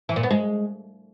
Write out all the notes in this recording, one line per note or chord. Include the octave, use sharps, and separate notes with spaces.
E3
A#2
B3
G#3